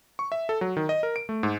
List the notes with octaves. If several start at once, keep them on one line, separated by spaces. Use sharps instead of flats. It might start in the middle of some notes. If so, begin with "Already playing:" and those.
C#6
E5
A4
F#3
D#3
D#5
A#4
D7
A3
G#2